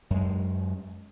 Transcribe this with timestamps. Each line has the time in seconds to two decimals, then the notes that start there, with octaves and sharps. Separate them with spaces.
0.10 F#2 G#3